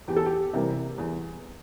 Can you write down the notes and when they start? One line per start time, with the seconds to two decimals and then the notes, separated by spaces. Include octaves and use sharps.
0.08 E2 G4
0.16 A4
0.26 G4
0.53 C3 E3 G3 A#3
0.98 E2